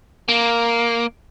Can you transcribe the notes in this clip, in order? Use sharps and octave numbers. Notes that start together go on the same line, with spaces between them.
A#3